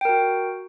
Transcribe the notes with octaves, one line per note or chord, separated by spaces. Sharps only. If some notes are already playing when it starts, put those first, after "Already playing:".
F#4 A#4 G5